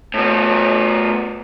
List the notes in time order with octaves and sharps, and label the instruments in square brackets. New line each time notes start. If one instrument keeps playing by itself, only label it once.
[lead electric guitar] A2 B3